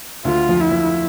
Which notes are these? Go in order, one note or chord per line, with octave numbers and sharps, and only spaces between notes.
D2 D3 F4
F2 F3
E4
F2 F3